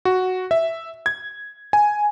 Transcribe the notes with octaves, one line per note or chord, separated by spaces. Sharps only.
F#4
E5
G#6
G#5